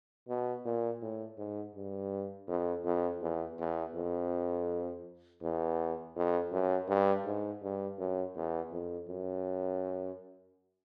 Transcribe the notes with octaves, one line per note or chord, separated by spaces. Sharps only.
B2
A#2
A2
G#2
G2
F2
F2
E2
E2
F2
E2
F2
F#2
G2
G#2
G2
F#2
E2
F2
F#2